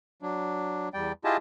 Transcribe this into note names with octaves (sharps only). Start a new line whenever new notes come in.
F#3 D4
E2 G3 D5 G5
E4 F4 G4 G#4 D#5 A5